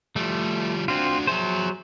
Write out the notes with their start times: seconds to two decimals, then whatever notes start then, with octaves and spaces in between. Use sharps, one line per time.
0.16 F3 G3 A3
0.88 C4 D4 F4 F#4
1.27 F#3 G#4 C5 E5